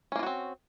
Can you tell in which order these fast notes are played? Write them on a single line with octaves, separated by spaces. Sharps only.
C#4 A#3 F4 F#4 C4